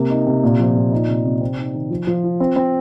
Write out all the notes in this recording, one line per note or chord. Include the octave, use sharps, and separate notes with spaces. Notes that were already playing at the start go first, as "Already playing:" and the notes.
Already playing: C3 A#3
D#4
C3
A#2
F3
A#2
D#4
C3
C3
C4
D#4
D#3
F3
F3
F4
C4
C4